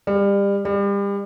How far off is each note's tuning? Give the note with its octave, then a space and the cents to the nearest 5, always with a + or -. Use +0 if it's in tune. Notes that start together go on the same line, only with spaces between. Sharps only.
G3 +30
G3 +35